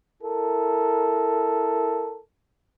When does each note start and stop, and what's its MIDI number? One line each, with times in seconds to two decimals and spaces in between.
0.23 2.20 64
0.23 2.20 69
0.23 2.20 70